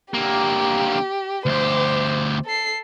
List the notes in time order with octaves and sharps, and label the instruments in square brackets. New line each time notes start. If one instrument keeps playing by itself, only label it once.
[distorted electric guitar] D3 A#3 [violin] G4
[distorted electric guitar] D2 G4 [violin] C5
[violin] A4 C7